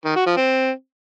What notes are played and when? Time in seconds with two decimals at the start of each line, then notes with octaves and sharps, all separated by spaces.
0.05 D#3
0.16 F#4
0.26 F3
0.37 C4